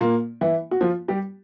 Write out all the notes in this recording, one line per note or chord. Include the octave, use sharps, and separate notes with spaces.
A#2 A#3
E3 E4
F#4
F3 F4
G3 G4